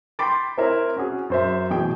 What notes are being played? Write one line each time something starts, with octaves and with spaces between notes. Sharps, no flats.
G5 B5 C6 D6 A6
C4 E4 A#4 C#5 E5
C#4 F#4 G#4
F#2 C5 E5
A1 B2 G#4 G5